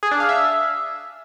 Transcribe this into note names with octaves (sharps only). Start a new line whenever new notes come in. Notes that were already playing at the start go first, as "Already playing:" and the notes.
G#4
D4
F5
E5